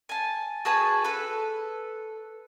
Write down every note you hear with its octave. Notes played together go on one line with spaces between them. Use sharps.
G#5 A5
F#4 G#4 B4 A5
A4 B4